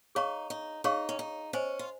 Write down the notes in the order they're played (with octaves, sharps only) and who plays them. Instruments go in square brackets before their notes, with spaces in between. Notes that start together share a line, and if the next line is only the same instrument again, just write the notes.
[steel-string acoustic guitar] D#4 [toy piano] G#4 C#5 F5 A#5 C#6
[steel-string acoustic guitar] D#4
[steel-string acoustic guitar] D#4 [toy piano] G#4 C#5 F5 A#5 C#6
[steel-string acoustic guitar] C#4
D#4
[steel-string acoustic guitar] C#4 [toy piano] C5 D#5 G#5
[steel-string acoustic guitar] F4